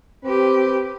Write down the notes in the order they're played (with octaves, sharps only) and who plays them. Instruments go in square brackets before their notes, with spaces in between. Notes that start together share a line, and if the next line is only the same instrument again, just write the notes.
[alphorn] C4 [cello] G4 B4